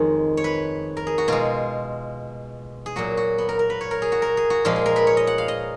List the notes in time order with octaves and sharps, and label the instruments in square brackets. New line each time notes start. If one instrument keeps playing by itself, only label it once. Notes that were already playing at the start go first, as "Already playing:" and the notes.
Already playing: [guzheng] F2 D#3 G#3 C#5 G#5
C#5
B4
A#4
G#4
F#4
B2 G#3 F4
G#4
A#2 F#3 F#4
F#4
B3
A#4
A#4
B4
C#5
A#4
G#4
F#4
A#4
G#4
F#4
A#2 F3 G#3 F4
G#4
A#4
B4
C#5
D#5
F#5
F5
D#5